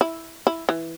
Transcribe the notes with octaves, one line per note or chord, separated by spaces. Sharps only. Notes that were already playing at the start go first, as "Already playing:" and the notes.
E4
E4
E3